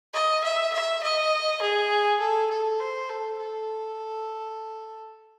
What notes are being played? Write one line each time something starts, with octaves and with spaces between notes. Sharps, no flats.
D#5
E5
E5
D#5
G#4
A4
A4
C5
A4
A4